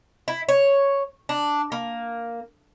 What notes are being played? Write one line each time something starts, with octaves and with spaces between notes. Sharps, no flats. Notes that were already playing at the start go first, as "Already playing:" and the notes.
E4
C#5
D4
A#3